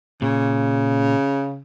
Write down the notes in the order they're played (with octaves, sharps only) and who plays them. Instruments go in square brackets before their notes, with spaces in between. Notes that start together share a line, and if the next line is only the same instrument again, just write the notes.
[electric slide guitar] A#2 [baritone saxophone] C#3